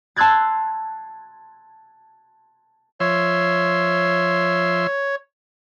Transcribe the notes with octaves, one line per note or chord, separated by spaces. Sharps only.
A5 C6 E6 F#6 G#6 A6
F3 C#5 E5 C6